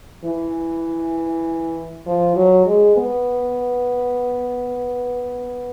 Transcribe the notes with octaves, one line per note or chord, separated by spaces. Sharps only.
E3
F3
F#3
G#3
B3